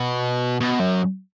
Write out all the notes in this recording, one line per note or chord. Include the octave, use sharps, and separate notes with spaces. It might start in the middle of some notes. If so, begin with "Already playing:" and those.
Already playing: B2
B2
F#2